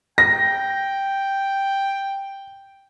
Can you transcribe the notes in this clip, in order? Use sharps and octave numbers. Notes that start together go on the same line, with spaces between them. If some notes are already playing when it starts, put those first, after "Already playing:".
G5 A#6